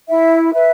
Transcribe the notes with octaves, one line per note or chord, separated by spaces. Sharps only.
E4 E5
B4 E5